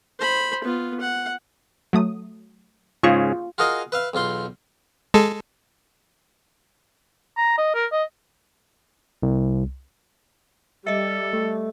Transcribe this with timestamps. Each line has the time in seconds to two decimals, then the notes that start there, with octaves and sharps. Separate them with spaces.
0.19 C5 B5
0.64 B3 F4
1.01 F#5
1.93 F#3 A3 D#6
3.03 G#2 C#3 F4 G#4 C#6
3.58 F4 F#4 G#4 A#4 D#5 F5
3.92 B4 E5 F5
4.14 B1 E2 F4 C6
5.14 G#3 A4
7.37 A#5
7.58 D#5
7.74 A#4
7.92 D#5
9.23 C2
10.87 G3 A4 D#5 E5
11.33 A3